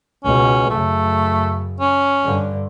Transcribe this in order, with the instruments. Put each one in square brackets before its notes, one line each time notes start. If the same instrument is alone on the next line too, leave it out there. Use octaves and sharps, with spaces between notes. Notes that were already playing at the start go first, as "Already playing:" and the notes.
[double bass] C#2 B2 [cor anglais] C#4
[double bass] F#2 C#3 [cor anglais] A3
[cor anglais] C#4
[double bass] G2 D3